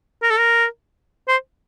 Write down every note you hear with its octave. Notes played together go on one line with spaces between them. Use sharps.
A#4
A4
A#4
C5